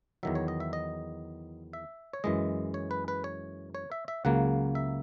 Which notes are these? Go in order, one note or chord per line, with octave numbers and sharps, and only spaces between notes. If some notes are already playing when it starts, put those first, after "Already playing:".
E2 D#3 F#3 E5
C#5
D#5
E5
D#5
E5
C#5
F#2 E3 G#3 D#5
C#5
B4
B4
C#5
C#5
E5
E5
C#2 C#3 F#3 A#3 F#5
E5